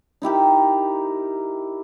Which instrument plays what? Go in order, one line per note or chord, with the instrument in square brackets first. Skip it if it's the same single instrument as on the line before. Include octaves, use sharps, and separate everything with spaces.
[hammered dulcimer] D#4 E4 G4 A#4